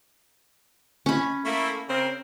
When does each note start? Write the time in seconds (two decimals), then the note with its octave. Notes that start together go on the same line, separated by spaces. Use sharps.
1.06 C#4 B5
1.44 A3 A#3 E4
1.88 C#3 C4 A#4